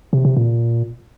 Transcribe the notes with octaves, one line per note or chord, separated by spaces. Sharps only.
C3
C3
A#2